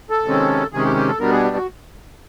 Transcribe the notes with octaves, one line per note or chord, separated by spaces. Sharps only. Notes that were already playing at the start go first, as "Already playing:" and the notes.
A4
C3 D#3 G#3 C#4
C3 D#3 G#3 C#4 G#4
G4
G4
A4
B2 G3 B3 D4 A#4
G#4
F#4